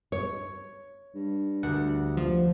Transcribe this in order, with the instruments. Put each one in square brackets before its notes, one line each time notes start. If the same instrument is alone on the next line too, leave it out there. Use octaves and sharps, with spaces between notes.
[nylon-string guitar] C#5
[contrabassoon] G2
[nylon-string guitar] D2 [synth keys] F#5
[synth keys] F3